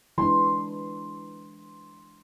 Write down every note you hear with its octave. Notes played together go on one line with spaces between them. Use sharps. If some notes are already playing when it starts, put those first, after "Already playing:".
E3 G#3 D4 C6